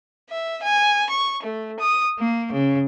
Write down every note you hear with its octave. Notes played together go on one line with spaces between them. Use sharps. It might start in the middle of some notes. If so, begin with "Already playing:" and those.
E5
G#5
C#6
A3
D#6
A#3
C#3